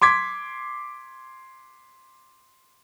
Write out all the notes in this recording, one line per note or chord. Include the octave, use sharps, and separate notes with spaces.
C6 D6 G#6 B6